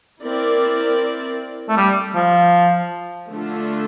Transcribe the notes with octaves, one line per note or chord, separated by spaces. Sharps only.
C4 E4 A#4 D5
A3
G3
F3
D3 A3 D4 F4 A4